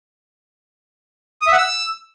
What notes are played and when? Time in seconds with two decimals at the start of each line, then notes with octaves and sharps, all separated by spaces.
1.42 D#6
1.47 E5
1.52 F#5
1.58 E6